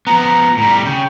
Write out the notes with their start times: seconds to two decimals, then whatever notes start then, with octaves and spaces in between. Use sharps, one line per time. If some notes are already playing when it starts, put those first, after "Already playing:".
0.07 F3 B3 A#5
0.57 A2 G3
0.85 C#3 G5